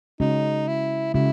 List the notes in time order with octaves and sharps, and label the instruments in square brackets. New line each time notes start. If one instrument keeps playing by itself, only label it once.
[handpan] C#3 G#3 C#4 F#4 [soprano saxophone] D#4
[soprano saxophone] E4
[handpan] C#3 G#3 C#4 F#4 [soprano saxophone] E4